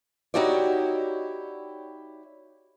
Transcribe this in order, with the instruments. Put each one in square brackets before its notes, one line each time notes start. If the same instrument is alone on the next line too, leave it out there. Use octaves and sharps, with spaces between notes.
[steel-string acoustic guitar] D#4 E4 F#4 G4 C#5 D5